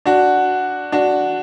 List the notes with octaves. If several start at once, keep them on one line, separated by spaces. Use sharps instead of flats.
D4 F#4
D4 F#4